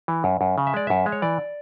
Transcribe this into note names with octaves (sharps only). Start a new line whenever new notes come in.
E3
F#2
F#2
C#3
E5
G#3 D5
F#2 E5
G#3
C#5
E3 D5